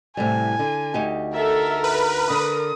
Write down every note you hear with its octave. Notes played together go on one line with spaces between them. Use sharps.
A2 C3 G3 G#5
D3
D2 D#4 G4
A4 A#4 E5
B4
D3 A#4 D#6